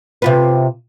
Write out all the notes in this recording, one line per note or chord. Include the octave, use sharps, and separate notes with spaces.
C3 F4 B4